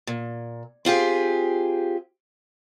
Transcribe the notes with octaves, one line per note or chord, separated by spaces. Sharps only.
A#2
C4 F4 G4 G#4